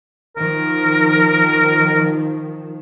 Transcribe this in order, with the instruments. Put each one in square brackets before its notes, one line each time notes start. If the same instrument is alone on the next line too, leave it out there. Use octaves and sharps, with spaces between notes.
[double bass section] D#3 F3 [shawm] A#4